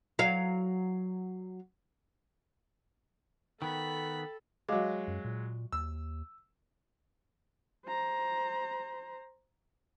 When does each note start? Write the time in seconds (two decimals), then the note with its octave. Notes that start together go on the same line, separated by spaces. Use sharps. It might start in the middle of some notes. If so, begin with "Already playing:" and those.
0.19 F#3 F5
3.62 D#3 B3 A4 G5 B5
4.69 F#3 G#3 D#5 F5 D6
5.08 F#2
5.25 A#2
5.72 D#2 E6
7.86 C5 A#5